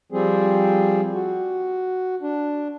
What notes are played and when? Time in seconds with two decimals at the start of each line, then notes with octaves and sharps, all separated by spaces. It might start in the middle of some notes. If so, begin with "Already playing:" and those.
0.12 F3 G3 C4 G#4
1.14 F#4
2.22 D4